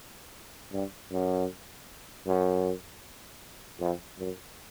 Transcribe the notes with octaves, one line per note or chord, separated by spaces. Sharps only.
G2
F#2
F#2
F2
F#2